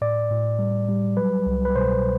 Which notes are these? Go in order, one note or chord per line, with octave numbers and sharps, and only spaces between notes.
A2 D5
A2
G3
G3
F#3 B4
C2
B4
B2 C5